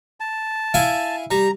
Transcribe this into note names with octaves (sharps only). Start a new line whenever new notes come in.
A5
E4 F5 G#5
G3 A#5